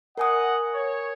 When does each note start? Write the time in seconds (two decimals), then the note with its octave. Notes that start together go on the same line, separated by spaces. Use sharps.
0.18 A#4 D#5 F#5 G#5 D#6
0.74 C#5